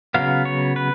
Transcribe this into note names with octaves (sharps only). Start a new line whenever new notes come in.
C#3 F#3 B3 F5
C#5
B4